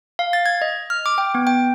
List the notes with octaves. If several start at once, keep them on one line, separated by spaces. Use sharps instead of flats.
F5
A6
G#6
D#5
F6
D6
G5
B3
G5